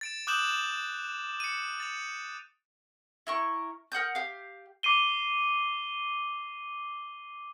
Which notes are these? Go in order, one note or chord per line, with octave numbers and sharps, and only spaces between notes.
A6 D7 E7
D6 D#6 F#6 G6 E7 F#7
C#7 D#7
A6 F7
E4 A#4 C#6
A#4 F#5 D#6 G6
G4 F5
D6 C7 D#7 G7